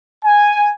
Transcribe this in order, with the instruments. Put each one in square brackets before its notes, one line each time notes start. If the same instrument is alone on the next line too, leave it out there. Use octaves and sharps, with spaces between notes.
[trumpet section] G#5